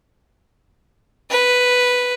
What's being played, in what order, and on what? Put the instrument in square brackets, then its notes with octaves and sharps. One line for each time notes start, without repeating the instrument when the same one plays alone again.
[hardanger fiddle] B4